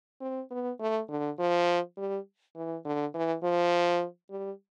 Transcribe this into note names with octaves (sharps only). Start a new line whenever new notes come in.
C4
B3
A3
D3
F3
G3
E3
D3
E3
F3
G3